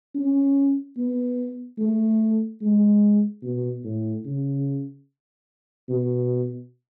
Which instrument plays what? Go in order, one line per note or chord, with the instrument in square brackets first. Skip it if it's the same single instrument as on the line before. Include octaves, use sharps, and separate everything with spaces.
[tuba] C#4
B3
A3
G#3
B2
A2
C#3
B2